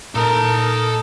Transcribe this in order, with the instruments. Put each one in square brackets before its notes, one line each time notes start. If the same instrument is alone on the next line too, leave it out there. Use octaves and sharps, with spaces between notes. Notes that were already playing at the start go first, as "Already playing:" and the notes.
[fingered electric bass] A#2 [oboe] D#4 [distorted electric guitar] A4 A#5 [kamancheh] A#4 A5